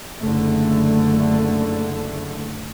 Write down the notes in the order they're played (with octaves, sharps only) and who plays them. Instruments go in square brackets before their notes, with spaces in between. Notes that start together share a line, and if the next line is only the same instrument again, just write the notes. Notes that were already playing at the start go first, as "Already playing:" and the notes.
[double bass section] F#1 D3 A3